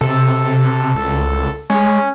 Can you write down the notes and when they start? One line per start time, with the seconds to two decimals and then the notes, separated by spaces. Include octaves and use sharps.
0.01 C3 A4
0.95 C#2
1.70 G#3 C#4